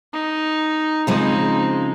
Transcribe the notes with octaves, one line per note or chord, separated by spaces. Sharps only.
D#4
C#3 F3 G#3 C4 D#4